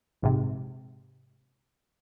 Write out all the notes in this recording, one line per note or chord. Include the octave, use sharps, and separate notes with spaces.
A#1 G#2 C3